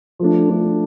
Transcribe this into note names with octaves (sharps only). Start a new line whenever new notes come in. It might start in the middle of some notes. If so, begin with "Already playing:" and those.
F3 A3 D4
F3 A3 D4